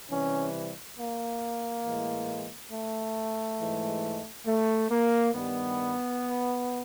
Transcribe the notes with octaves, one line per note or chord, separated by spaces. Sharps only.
C3 E3 G3 C#4
A#3
A2 E3 G#3
A3
G#2 E3 G#3
A3
A#3
G2 D#3 G3 B3